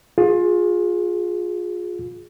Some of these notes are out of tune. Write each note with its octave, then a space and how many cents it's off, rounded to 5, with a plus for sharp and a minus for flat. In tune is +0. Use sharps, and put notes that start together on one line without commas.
F4 +25 G#4 +0